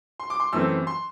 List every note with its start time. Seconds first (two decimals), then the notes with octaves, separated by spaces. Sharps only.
0.20 C6
0.30 D6
0.40 C6
0.53 F#2 E3 A3 C4 E6
0.87 C6